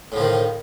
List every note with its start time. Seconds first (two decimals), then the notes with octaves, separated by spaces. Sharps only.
0.12 A2
0.16 F3
0.20 D#3